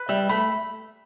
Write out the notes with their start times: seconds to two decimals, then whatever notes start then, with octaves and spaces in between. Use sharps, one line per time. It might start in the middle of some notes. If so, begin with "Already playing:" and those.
Already playing: B4
0.09 G3 E5
0.29 A3 B5